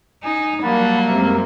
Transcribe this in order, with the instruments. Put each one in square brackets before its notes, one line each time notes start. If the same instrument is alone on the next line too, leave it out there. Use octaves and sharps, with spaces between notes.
[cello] D#4 [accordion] G#5
[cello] F#3 G3 [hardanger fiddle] A#3 [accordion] F#5 A5 B5
[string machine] F#2 G#3 C4 [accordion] C3 A#4 E5